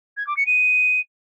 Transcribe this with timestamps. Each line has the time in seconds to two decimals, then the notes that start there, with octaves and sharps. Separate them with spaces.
0.17 G#6
0.27 D6
0.36 C#7
0.46 D#7